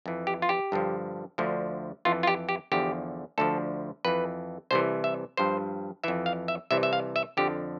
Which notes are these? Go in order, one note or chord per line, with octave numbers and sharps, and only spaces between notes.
F2 E3
G4
F4
G4
G2 D3 F3
D2 D3 F3
F2 E3 F4
F4
G4
G4
E2 D3 F3 G4
D2 D3 F3 A4
F2 E3 B4
C2 C3 E3 C5
E5
G2 F3 C5
F2 E3 E5
F5
E5
C2 C3 E3 E5
E5
F5
E5
F2 D3 F3 G4